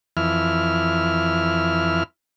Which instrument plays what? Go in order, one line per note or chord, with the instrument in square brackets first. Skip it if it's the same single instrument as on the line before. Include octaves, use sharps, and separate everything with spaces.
[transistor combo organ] F2 E3 E4 F6